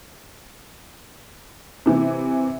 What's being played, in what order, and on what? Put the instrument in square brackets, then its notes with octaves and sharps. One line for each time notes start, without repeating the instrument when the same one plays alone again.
[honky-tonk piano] C3 E3